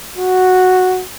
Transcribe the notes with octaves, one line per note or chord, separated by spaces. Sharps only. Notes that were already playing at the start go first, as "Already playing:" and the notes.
F#4